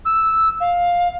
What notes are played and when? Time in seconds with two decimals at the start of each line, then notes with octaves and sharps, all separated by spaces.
0.05 E6
0.60 F5